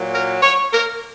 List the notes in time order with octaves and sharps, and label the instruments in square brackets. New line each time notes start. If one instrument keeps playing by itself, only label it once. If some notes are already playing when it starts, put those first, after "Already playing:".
Already playing: [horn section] A#2 F#3
A#4
C#5
A#4